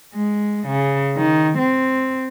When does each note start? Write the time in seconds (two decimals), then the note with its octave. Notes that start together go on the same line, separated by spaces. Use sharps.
0.14 G#3
0.67 C#3
1.17 D#3
1.58 C4